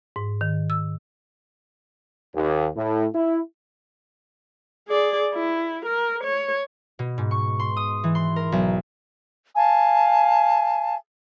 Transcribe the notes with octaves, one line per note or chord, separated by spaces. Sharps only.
G#2
D#3
E6
D#2
A2
E4
G#4 D5
E4
A#4
C#5
B2
G#2
C#6
C6
D#6
E3
C6
A#4
B1
F5 G#5 A5